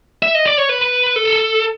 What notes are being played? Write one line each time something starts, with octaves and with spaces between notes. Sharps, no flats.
E5
D#5
D5
C#5
B4
A4